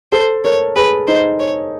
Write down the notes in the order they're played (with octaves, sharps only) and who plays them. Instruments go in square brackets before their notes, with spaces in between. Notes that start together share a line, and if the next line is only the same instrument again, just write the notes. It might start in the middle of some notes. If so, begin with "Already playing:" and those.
[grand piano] A4 [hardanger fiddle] C5
[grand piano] A#4 [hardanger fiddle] C#5
[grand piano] G#4 [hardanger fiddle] B4
[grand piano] D#4 [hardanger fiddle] C5
[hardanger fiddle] C#5